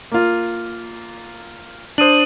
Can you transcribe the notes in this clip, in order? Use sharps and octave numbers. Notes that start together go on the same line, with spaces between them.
A#3 F4
D4 C5 D#6 D#7 F#7